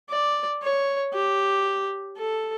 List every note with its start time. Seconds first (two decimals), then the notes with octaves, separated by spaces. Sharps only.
0.10 D5
0.63 C#5
1.13 G4
2.18 A4